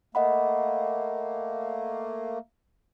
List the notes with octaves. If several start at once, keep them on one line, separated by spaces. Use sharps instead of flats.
A3 A#3 D#5 F#5 B5